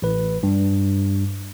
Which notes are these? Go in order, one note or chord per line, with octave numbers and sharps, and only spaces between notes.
A1 B4
G2